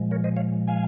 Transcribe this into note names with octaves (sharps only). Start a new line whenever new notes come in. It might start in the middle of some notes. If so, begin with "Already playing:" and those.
Already playing: A#2 F3 G#3
A#4 C#5
C5 D#5
C#5 F5
F5 G#5